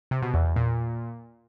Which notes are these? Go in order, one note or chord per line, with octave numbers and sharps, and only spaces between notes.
C3
B2
E2
E2
A#2